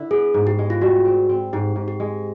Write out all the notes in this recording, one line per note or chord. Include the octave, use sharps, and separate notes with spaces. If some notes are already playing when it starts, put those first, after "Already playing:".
Already playing: D3 E4
B3 G#4
G#2
G4
G#3
F4
G3 F#4
C4
C4
G#2 G4
G#2
G4
G#3